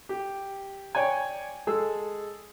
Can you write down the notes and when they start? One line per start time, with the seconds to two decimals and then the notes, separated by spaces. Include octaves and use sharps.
0.09 G4
0.95 C#5 D5 G5 G#5
1.67 G#3 G#4 A4 E6